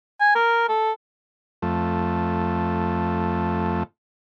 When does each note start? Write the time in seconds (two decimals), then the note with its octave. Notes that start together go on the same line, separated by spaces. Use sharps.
0.20 G#5
0.35 A#4
0.69 A4
1.62 F2 A3